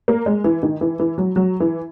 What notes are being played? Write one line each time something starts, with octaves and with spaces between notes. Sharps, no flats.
A#3
G#3
E3
D#3
E3
E3
F#3
F#3
E3